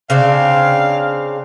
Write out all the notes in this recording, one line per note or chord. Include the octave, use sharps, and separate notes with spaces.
C#3 C4 D4 F5